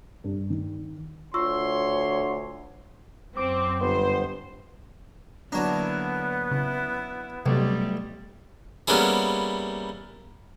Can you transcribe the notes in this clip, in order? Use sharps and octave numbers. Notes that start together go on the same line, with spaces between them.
G2
D#3
D2 F4 C#5 C6 C#6 E6
F#2 C4 D6
G1 B3 C5
D3 F#3 A#3 B3 D4 E4 A#5
C#3 E4
B1 C3 G3 A3
G3 A#3 B3 C#4 E4 G#4